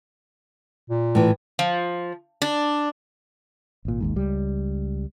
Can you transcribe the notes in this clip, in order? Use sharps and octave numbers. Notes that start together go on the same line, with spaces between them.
A#2
A2 E3
F3
D4
G#1 A#2
G#1 D#2 G#2
C#2 G3